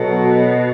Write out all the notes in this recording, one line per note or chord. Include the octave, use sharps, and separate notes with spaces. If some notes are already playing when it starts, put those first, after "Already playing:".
Already playing: B2 F#3 B3 F#4 A4